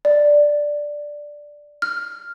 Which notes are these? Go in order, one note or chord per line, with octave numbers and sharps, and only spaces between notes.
D5
F6